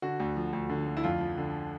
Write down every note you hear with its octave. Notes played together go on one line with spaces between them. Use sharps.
D3 F#4
D2
F3
D2
D3
D2
E4
F2 F4
F3
D3